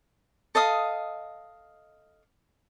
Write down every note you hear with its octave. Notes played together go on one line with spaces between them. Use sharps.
A4 D#5 F5 D#6